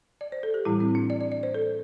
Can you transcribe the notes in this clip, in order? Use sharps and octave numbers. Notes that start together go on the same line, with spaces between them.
D5
C5
A4
G4
A2 E3 G3 E4
C4
D4
D5
D5
D5
C5
A4